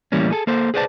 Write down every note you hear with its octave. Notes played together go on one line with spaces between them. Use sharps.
A2 E3 G3 A#3 C#4
G#4 A4
A#3 A4 C5
G#4 B4 C5 D5 D#5 A5